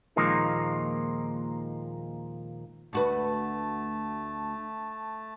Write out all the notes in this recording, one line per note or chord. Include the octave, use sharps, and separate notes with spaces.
D#2 A#2 F3 G#3 A#3 D#4
D2 A3 F#4 B4 A5